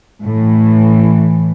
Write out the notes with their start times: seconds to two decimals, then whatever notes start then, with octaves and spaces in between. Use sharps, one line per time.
0.24 A2 E3